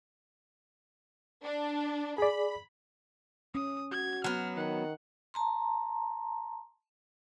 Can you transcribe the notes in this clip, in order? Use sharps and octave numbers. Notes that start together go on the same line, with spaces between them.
D4
G#4 D5 B5
C#4 D#6
F#4 G#6
F#3 B3 F6
D#3 F#5
A5 A#5 C6